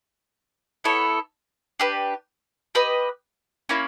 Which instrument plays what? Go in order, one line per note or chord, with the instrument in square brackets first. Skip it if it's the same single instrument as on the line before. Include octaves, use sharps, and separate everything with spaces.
[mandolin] B3 E4 A4 C#5
D4 G4 B4
G4 B4 D#5
A#3 C#4 E4